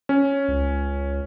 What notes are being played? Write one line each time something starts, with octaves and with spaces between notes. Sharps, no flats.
C#4
C#2